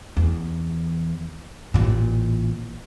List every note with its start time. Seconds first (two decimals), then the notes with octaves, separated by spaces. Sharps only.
0.17 E2
1.74 A1 A#2